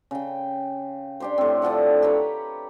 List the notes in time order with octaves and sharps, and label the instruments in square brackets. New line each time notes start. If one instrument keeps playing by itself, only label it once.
[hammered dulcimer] C#3 G5
D4 G4 C5
A2 C4
D3 F3 A4 F#5
G4 B4 C#5 A#5